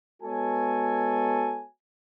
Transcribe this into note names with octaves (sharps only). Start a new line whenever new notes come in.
G#3 B3 F#4 A4 C#5 G#5